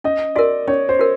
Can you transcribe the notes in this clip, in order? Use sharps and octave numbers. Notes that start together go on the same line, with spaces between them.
C#4 D#5
F#4 A#4 D5
C#4 C#5
C5
F#4 A#4